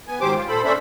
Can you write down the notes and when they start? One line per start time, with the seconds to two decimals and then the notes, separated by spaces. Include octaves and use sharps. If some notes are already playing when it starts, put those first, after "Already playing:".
0.08 B3 G#5
0.21 G#2 D#3 F#3 G4 C5 D6
0.34 F4
0.48 A#2 A4 C5 B5
0.65 C#4 D4 A4 C5 E5 B5